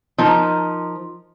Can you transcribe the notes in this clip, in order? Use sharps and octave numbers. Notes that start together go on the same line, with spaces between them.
F3 D#4 A#4